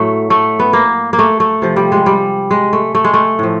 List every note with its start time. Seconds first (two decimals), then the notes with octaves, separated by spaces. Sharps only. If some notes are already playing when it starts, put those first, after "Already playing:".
Already playing: A2 F#3 A3
0.30 A3
0.59 B3
0.73 A#3
1.13 A#3
1.19 A3
1.40 A3
1.62 C3 F3
1.76 G3
1.92 G#3
2.06 G3
2.51 G#3
2.73 A3
2.95 A3
3.04 G#3
3.14 A3
3.39 A2 F3